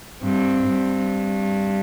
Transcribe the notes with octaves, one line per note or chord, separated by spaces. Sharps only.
G2 C4
G2